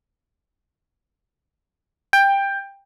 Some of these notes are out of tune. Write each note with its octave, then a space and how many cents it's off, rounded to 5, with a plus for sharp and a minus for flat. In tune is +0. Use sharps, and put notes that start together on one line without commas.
G5 +15